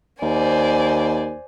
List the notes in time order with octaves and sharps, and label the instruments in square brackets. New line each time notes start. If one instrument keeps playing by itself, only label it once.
[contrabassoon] D#2 [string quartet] C5 D5 G#5